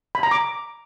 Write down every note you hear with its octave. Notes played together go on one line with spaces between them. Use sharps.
B5
A#5
D6